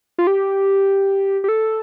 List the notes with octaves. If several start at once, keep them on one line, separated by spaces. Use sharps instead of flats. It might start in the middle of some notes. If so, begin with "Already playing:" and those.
F4
G4
G4
A4